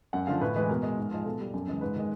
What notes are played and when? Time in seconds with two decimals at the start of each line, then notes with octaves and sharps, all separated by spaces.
0.13 F#2 F#5
0.27 D3 F3 F5
0.41 A2 B4
0.56 E3 G#3 B4
0.69 B2 A#4
0.83 G#3
0.98 G#2
1.11 F3 G#3
1.25 B2 A4
1.40 G3
1.54 F#2
1.67 C#3 E3 G#3
1.81 G#2 B4
1.96 D#3 G#3